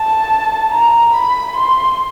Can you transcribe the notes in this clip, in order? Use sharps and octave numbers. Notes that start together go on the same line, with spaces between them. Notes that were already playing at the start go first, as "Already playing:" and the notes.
Already playing: A5
A#5
B5
C6